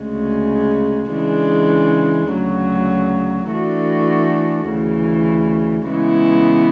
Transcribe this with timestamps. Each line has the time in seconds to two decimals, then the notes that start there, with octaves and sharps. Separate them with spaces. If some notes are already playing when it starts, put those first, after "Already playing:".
Already playing: D2 C#3 G#3
1.11 C#3 E3 G#3 D4
2.30 D2 C#3 F#3
3.50 E3 A3 D4 F#4
4.68 D2 C#3 E3
5.88 C#3 E3 G#3 B3 E4